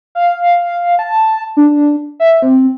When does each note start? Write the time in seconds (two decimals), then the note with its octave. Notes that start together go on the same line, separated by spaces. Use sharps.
0.15 F5
0.99 A5
1.57 D4
2.20 E5
2.42 C4